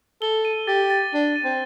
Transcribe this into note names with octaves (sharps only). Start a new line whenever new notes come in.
A4 G7
D#7
G4 A6
A6
D4 G7
D#7
C4